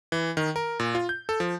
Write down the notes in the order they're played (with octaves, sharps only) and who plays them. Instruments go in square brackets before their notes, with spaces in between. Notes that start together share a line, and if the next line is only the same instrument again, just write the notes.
[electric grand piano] E3
D#3
A#4
A#2
F4
G6
A4
F3